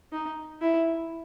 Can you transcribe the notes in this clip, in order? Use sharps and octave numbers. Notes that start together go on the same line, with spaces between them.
D#4
E4